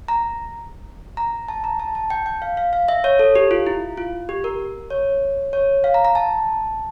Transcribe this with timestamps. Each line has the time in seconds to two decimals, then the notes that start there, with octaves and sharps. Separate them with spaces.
0.08 A#5
1.17 A#5
1.48 A5
1.64 A#5
1.80 A5
1.95 A5
2.10 G5
2.26 G5
2.42 F5
2.57 F5
2.73 F5
2.88 E5
3.04 C#5
3.19 A4
3.35 G4
3.51 F4
3.67 E4
3.97 F4
4.29 G4
4.44 A#4
4.90 C#5
5.53 C#5
5.84 F5
5.94 A#5
6.05 A#5
6.15 A5